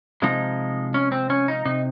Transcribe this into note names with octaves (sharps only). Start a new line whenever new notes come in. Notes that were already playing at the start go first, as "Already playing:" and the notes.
C3 F3 G#3 D#4
C#4
C4
C#4
D#4
C3 D#4